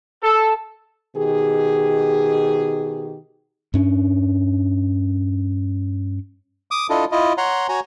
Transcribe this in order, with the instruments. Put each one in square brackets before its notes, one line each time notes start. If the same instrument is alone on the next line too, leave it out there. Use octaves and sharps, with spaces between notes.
[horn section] A4
[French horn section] B2 D#3 G4 G#4
[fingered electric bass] G2 C#4 D4
[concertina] D6 D#6
D4 E4 F4 A4 D#5
E4 F4 D#5
C#5 F#5 A#5 C6
F#4 C#5 G#5 A#5